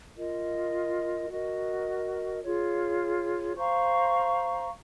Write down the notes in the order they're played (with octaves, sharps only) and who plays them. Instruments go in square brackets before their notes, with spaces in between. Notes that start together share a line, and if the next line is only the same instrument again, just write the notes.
[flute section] F4 A#4 D#5
F#4 A#4 D#5
F4 G#4 C#5
C5 F5 A#5 C#6